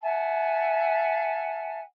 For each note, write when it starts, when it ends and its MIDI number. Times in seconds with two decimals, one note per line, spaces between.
0.02 1.80 76
0.02 1.80 78
0.02 1.80 80
0.02 1.80 81